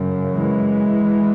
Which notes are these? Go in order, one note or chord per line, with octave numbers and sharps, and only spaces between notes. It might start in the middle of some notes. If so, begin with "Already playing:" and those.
Already playing: F#2 C#3
E3 G#3